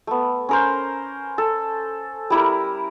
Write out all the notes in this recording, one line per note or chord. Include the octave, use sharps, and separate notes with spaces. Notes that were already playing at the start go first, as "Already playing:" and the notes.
A3 B3
C#4 A#4 C5
A4
G3 E4 A#4